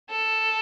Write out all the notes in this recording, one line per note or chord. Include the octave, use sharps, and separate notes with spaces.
A4